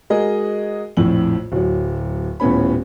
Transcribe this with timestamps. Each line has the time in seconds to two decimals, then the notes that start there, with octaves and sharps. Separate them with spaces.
0.10 G#3 F#4 G#4 A#4 D#5
0.97 A#1 F2 A2 F#7
1.52 D1 F#3
2.40 D#1 A2 B3 C#4 B5